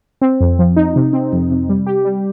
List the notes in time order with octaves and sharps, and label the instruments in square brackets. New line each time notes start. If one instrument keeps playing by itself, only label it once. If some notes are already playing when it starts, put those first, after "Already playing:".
[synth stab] C4
F2
F3
D#4
C3
C4
F2
C3
G3
G4
G3